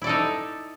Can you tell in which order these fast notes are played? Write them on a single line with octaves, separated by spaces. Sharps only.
E4 D5 A4 D#4